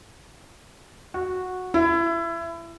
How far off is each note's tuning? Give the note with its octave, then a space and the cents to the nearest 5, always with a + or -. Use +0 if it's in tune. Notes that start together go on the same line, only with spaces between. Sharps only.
F#4 -10
E4 +25